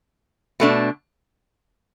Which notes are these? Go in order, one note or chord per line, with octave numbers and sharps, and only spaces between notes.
B2 A3 D4